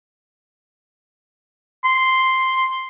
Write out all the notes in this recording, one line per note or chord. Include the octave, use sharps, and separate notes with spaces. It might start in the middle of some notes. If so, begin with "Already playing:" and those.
C6